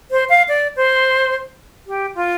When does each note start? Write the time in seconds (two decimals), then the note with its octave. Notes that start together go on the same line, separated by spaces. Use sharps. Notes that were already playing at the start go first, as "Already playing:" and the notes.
0.11 C5
0.29 F5
0.48 D5
0.76 C5
1.87 G4
2.15 F4